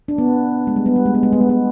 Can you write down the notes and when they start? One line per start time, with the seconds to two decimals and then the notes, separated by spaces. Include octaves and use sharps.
0.08 D4
0.18 B3
0.67 G#3
0.76 G3
0.86 B3
0.96 G3
1.06 G#3
1.15 B3
1.23 G#3
1.33 B3
1.41 G#3
1.49 B3